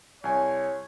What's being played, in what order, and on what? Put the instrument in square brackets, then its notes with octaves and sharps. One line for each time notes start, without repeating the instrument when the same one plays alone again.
[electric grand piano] C2 G#5 [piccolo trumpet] C#5